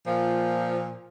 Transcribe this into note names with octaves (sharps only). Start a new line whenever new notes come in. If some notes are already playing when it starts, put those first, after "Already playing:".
A#2 F3